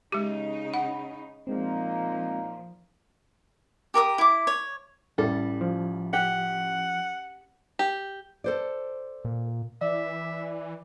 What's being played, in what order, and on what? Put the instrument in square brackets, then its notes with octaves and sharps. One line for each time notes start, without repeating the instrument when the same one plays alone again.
[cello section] C#3 D#4 [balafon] G#3 G4
[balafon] F#5 [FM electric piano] B5
[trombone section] A#2 A#3 D#4 [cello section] F3 [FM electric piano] G#3 C4
[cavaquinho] G4 A#4 D6 D#6
E4 D6
C#5
[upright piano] A1 E4 [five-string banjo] G3 A4
[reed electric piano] F3
[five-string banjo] G4 [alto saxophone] F#5
[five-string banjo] G4
[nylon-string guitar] A4 C5 D5
[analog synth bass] A#2
[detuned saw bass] E3 [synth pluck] D5 [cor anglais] E5